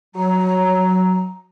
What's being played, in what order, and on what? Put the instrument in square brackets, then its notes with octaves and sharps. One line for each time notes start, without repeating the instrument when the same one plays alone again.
[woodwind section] F#3 [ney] A#5